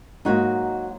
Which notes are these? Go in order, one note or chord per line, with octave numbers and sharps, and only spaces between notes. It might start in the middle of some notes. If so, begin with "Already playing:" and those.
G#2 F#3 A#3 D#4 F#4